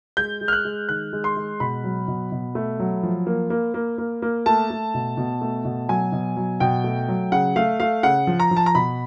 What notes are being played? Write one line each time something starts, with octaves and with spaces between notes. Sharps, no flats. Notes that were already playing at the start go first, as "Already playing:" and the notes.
G#3 G6
G#3
F6
F#6
G#3
D#3 F#6
G#3
C6
G#3
B2 B5
F#3
B2
B2
A3
F#3
F3
A#3
A#3
A#3
A#3
A#3
A3 A5
A3
B2
B2
A3
B2
F#3 G#5
B2
F#3
B2 G5
A3
F#3
C#3 F#5
A3 F5
A3 F5
C#3 F#5
F3
A#5
F3
A5
A#5
B2 B5